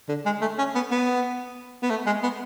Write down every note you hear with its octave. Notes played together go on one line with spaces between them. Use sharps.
D3
G#3
A3
C#4
B3
B3
B3
A3
G#3
B3